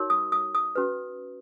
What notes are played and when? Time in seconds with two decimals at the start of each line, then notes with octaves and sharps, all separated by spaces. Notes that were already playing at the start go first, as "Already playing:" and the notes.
Already playing: D#4 F#4 A#4 C#5
0.10 D#6
0.32 D#6
0.55 D#6
0.75 C#4 F#4 B4